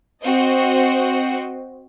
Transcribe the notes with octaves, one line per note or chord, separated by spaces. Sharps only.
C4 F#4 C5 D#5